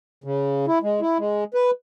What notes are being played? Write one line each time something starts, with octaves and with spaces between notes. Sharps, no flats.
C#3
E4
G#3
E4
G#3
B4